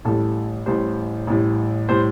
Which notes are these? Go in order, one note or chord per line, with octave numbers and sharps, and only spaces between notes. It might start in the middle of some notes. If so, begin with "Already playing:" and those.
A1 A2 G3 A4
A1 A2 G3 C5
A1 A2 G3
A2 G3 C5